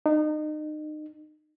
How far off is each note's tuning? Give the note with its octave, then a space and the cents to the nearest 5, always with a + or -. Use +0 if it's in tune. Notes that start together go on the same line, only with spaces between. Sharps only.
D#4 -30